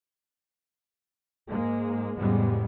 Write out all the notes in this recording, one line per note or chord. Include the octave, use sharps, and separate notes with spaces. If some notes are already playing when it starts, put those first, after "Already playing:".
G#2 G#3 A#3
F2 A2 C#3 G3 G#3 B3